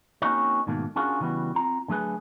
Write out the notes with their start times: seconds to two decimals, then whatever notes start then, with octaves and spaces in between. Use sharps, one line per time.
0.22 A#3 C4 C#4 D#4 F#4 C#5
0.67 G#2 B2 D#3 A3 A#3
0.96 C#4 D4 F4 F#4 G#4 A#4
1.20 C#3 E3 G3 B3 F#4
1.55 C4 F4 A#5
1.88 D3 F#3 A3 G#4 B4